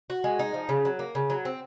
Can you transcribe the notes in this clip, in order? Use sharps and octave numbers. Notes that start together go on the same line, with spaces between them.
F#4
G#3
D#4
F3
C#3
F#3
A#3
C#3
F#3
C4